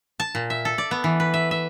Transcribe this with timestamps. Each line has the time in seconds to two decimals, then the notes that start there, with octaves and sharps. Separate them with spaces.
0.20 A5
0.35 A#2
0.50 E5
0.65 A4
0.78 D5
0.91 B3
1.04 E3
1.20 B4
1.34 E5
1.51 E5